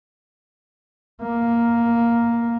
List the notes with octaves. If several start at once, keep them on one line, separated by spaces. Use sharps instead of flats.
A#3